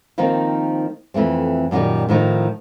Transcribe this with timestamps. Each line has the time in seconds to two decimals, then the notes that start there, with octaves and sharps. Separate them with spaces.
0.18 D#3 F3 A#3 C4 D#4
1.14 F2 E3 A3 C4
1.71 F#2 A#2 D3 D#3 G3
2.09 A2 D#3 F3 D#4